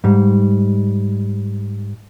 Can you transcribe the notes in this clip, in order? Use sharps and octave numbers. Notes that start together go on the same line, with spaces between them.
G#2 G3